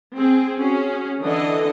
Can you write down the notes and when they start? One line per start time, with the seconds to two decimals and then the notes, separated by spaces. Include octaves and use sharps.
0.16 C4 G#4
0.59 C#4 F#4 G#4
1.21 D3 E3 D4 A4 D#5